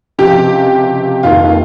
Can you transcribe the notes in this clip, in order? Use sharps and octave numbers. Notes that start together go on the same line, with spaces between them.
C#2 C3 F3 G4
F1 D#2 D#3 F4